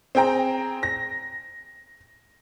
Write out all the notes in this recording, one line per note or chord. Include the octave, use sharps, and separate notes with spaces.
C4 G#4 G5 A#5
A#6